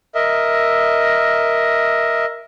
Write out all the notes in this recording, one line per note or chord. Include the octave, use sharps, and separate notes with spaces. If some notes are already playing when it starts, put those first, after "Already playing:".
A#4 D#5 E5